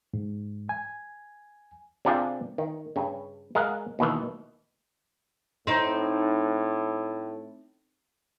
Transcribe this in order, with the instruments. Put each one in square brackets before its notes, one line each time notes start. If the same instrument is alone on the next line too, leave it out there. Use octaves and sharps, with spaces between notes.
[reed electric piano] G#2
G#5
[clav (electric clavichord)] C3 C4 D4 F4 G4 G#4
D#3
G2 C#3
G#3 A#4 F5 F#5
D#2 B2 D#3 E3
[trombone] A2 [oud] C4 D#4